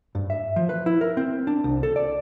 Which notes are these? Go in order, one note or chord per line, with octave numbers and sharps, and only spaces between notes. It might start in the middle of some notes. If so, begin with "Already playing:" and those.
G2
E5
F3
B4
E4
A#4
C4
D4
C2
A4
D5